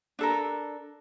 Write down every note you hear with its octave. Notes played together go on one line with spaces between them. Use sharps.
D4 A4 A#4